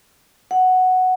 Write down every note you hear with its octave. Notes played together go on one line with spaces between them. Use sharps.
F#5